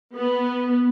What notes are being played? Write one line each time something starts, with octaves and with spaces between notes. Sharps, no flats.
B3